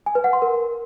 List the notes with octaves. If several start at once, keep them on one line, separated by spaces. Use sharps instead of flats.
G#5
B4
F#5
C6
A#4